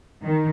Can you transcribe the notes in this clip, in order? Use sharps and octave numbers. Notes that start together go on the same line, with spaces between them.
D#3